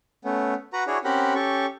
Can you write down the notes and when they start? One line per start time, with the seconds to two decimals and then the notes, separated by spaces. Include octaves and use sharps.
0.25 A3 B3 C#4
0.73 F#4 B4 F#5 A#5
0.87 D4 E4 F#4 G#4 C#5
1.04 C4 C#4 G4 A#4 F#5 B5
1.35 C#4 G4 A4 C#6